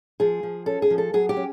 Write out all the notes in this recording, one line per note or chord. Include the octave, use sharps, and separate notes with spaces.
F3 G#4
F3
C#4 A4
G#4
F3
A4
F#3 G#4
G4
C#4